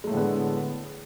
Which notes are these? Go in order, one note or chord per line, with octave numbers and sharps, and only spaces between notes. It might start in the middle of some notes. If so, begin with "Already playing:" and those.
A2 D3 G#3 A3 B3